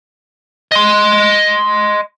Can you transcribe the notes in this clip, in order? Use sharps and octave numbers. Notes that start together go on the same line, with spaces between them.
D#5 C6